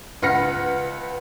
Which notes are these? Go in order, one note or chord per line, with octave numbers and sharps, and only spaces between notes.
C#2 B4 F#5 F6 A#6 C#7